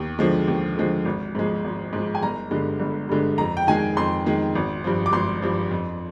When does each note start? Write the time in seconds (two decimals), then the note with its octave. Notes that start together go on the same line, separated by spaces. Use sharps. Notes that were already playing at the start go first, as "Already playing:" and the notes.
Already playing: D#2
0.19 D3 F3 G#3
0.48 D#2
0.77 D3 F3 G#3
1.05 G#1
1.35 G#2 F3 G#3
1.64 G#1
1.93 G#2 F3 G#3
2.15 G#5
2.23 G1 A#5
2.51 G2 D3 G#3
2.80 G1
3.09 G2 D3 G#3
3.38 F2 A#5
3.57 G5
3.67 D#3 G#3 G#5
3.97 F2 C6
4.26 D#3 G#3
4.55 G#1
4.84 G2 F3
5.06 D6
5.13 G#1 C6
5.42 G2 F3
5.71 F2